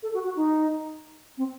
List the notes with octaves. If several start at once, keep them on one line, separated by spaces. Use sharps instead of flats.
A4
F#4
F#4
D#4
C4